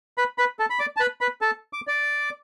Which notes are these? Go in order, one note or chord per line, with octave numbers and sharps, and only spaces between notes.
B4 B5
B4 B5
A4 A5
B5
D5 D6
A5
B4 B5
B4 B5
A4 A5
D6
D5 D6